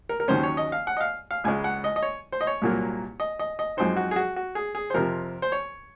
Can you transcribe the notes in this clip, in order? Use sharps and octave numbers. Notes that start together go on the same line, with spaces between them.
A#4
A#4
D#2 D#3 F#3 C#4 C5
C#5
D#5
F5
F#5
D#5
F5
F5
C#2 C#3 G#3 G#5
F#5
D#5
D#5
C#5
C5
D#5
C#5
C2 A#2 F#3 A#3
D#5
D#5
D#5
F#2 F3 G#3 C4 D#4 C5
F#4
G#4
F#4
F#4
G#4
G#4
C5
F2 C3 F3 A#4
C5
C#5